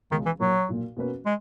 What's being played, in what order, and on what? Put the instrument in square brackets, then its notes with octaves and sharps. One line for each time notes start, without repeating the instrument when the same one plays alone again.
[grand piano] C#2 B2 G#3 C#4 [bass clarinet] D#3
[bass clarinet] E3
[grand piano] B1 A#2 A#3 [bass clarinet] F#3
[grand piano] B1 A#2 A#3
B2 A#3 C#4 F#4 B4
[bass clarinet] G#3